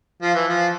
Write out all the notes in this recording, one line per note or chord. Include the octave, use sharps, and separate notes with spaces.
F3
E3
F3